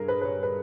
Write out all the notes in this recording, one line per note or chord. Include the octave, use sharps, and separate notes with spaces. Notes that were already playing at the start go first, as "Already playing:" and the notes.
Already playing: G2 G#4 A#4
B4
B4
C#5
B4